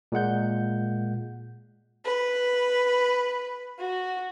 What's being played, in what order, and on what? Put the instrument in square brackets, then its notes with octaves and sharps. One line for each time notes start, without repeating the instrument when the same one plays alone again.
[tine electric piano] A#2 G#3 F#5 G6
[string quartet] B4
F#4